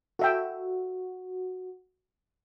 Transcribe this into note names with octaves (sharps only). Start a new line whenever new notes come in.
F#4 A4 E5 G5